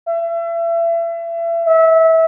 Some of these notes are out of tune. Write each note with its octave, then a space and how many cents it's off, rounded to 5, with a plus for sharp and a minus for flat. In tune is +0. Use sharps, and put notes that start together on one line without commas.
E5 +35
E5 -25